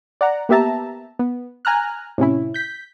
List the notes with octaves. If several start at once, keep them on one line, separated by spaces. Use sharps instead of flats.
D5 F#5 A#5
A#3 B3 G4 E5 A5 A#5
B3
G#5 A#5 F6 F#6
A2 C3 C#4 E4
G6 B6